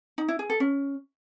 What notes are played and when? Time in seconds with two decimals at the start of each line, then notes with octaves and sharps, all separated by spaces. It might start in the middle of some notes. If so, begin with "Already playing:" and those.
0.18 D#4
0.28 E4
0.39 G#4
0.50 A4
0.60 C#4